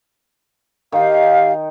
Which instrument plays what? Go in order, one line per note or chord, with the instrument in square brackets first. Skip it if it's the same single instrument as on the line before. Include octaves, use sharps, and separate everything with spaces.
[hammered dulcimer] D#3 G5 [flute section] G4 F5